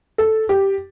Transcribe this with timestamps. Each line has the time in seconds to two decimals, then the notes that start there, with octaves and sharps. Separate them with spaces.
0.18 A4
0.49 G4